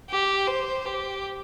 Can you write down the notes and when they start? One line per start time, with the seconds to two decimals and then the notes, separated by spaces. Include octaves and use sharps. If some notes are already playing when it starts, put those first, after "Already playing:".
0.10 G4
0.47 C5
0.85 G4